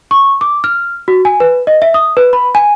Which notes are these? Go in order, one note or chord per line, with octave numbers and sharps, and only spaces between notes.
C#6
D6
F6
F#4
G#5
B4
D#5
E5
D#6
B4
B5
G#5